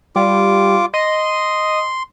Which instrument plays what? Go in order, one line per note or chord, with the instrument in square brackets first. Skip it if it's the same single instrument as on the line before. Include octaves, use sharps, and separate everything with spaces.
[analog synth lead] G3 [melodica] F4 D6
[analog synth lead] D#5 [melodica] C6